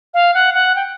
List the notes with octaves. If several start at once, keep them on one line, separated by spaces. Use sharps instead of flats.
F5
F#5
F#5
G5